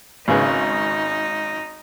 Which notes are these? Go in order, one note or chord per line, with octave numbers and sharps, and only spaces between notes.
G#1 C#3 D#4 B4